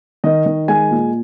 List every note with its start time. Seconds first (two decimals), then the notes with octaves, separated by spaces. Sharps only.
0.24 D#3 D#5
0.46 D#3
0.68 G#3 G#5
0.91 A#2